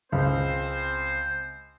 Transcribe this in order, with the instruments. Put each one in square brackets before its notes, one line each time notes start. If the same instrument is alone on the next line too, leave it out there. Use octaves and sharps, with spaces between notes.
[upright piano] C#2 [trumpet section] C4 C5